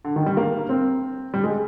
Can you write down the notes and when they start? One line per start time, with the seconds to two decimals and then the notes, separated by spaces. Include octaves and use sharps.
0.05 D3
0.16 D#3
0.26 G3
0.37 A#3
0.69 C4
1.34 G3
1.44 G#3